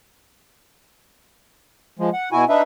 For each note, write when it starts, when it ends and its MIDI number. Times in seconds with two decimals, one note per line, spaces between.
1.99 2.10 53
1.99 2.10 56
2.13 2.29 78
2.32 2.44 47
2.32 2.44 64
2.32 2.44 66
2.32 2.44 80
2.49 2.62 62
2.49 2.62 63
2.49 2.62 71
2.49 2.62 76